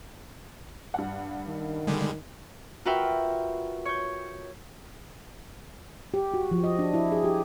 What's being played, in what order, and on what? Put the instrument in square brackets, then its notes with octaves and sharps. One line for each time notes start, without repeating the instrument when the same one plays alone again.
[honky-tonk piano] G2 F#5
[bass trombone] D#3
[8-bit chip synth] D3 G3 G#3
[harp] F4 F#4 A#4 B4 E5 G5
C#5 G6
[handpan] G4
F#4
F3
D#5
D4
E4
G#4
G4